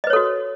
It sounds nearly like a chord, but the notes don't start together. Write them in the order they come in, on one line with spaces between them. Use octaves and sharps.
D#5 B4 C#5 A4 F#4